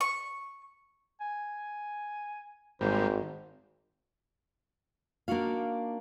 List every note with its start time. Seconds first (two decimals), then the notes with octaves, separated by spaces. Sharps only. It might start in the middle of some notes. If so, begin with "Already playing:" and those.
0.01 C#6
1.21 G#5
2.81 G#1 G#2 G3 A#3 C5
5.28 A#3 D4 D#4 F#4 F5